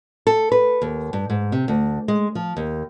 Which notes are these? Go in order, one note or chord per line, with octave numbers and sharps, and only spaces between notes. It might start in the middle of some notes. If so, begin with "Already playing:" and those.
A4
B4
D#2
G2
G#2
C3
D2
G#3
F3
D#2